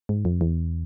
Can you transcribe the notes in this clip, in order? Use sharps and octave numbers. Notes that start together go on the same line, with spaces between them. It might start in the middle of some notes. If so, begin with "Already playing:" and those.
G#2
F2
E2